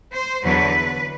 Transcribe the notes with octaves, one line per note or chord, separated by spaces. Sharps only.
C5
E2 D3 F#3 B4